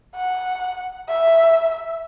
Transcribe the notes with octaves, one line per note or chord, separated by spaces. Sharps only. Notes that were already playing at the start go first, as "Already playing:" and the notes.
F#5
E5